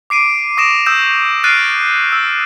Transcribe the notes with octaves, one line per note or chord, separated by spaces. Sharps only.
D6 C7 D7 D#7
C#6 D#6 A#6 D7 E7
D#6 E6 G6 E7
F6 F#6 A6 C7 D7 D#7
E6